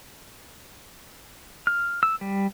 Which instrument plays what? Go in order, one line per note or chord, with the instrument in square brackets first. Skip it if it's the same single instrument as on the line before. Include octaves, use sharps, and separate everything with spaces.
[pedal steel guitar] F6
E6
G3